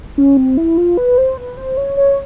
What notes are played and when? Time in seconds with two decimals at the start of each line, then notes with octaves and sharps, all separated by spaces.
0.18 C#4
0.37 C4
0.57 E4
0.78 F4
0.97 B4
1.18 C5
1.37 B4
1.57 C5
1.77 C#5
1.97 C#5